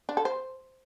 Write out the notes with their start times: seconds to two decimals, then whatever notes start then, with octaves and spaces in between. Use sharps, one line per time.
0.09 D4
0.17 A4
0.25 C5